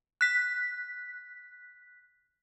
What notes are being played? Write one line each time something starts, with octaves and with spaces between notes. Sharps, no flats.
F#6 B6